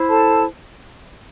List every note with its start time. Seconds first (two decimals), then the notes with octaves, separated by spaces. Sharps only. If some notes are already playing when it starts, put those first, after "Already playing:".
Already playing: E4 C5
0.08 A4 A5